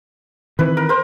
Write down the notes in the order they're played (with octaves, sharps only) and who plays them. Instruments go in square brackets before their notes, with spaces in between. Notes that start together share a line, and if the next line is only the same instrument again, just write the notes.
[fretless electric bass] D#3 E3 C4 [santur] B4
[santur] A#4
A#4 C5